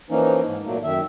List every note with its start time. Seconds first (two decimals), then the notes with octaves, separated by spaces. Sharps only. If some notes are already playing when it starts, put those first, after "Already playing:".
0.10 E3 F3 A#3 C#4 D#4
0.46 G#2
0.65 A#2 F#3 A3 A#3
0.84 F#2 D#3 E5